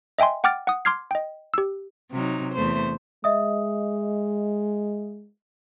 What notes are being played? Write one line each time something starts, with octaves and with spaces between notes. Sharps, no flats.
D#5 E5 G5 G#5 C6
F#5 G5 D6 F6 A6 D7
F#5 D#6
C6 D6 F6 G#6 C7
D#5 G5
G4 E6
C3 F#3 D#4
E2 A3 C5
G#3 D#5 E5 D#6